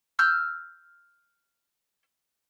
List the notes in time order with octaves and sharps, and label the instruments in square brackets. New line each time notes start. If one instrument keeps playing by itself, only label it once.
[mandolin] E6 F6 G6